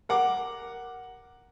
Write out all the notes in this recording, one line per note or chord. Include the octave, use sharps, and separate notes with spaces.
A#4 F#5 D6